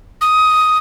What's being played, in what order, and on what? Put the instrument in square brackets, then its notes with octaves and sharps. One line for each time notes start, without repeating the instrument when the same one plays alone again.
[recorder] D#6